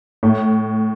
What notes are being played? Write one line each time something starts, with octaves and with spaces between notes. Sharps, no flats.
A2